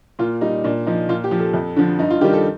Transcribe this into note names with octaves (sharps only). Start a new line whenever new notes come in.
A#2 F4
G3 D#4
A#2 D4
F3 D#4
A#2 F4
G4
F3
A4
F2
D3 F3
G2 D#4
F4
D#3 G3 G4
A4